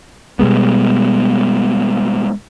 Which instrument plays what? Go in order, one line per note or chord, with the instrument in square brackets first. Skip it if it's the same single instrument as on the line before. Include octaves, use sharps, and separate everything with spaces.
[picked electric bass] B2 G3 G#3 B3